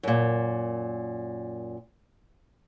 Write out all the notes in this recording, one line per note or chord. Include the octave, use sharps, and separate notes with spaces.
F#2 A#2